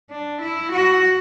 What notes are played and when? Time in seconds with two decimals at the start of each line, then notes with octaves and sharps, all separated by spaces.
0.11 D4
0.41 E4
0.72 F#4